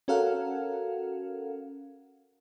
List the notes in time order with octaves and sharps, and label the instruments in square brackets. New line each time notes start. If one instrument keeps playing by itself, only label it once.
[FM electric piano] C#4 F#4 A4 A#4 F5 F#5